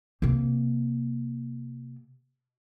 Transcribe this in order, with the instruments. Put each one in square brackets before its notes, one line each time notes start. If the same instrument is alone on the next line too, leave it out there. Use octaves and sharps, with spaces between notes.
[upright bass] C3 A#3